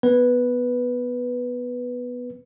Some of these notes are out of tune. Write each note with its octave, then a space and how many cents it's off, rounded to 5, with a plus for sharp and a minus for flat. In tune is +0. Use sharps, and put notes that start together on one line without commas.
B3 +0 B4 -5